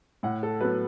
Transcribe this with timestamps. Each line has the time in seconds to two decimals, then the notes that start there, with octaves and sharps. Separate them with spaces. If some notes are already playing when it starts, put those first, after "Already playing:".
0.23 A2 F#5
0.43 A4
0.61 F#3 B3 B4